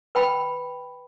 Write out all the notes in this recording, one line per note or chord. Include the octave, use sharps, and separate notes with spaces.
B4 G5 B5